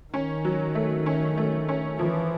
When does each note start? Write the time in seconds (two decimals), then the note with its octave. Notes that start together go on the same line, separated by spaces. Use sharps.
0.13 D#3 C#4
0.45 F#3
0.75 A3
1.06 C#4
1.37 A3
1.68 C#4
1.99 E3 F3